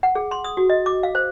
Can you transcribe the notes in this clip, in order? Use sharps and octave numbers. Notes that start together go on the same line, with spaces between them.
F#5
G#4
C6
D#6
F#4
D#5
D6
F5
C5